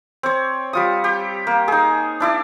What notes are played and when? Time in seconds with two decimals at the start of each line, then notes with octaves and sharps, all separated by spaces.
0.23 C4 C#5
0.73 G3 F4 D#6
1.04 G4
1.47 A#3
1.68 D#4 G#4
2.20 D4 E4 D5